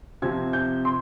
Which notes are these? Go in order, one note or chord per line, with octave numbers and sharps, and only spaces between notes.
C3 F3 C4 G#6
G6
C6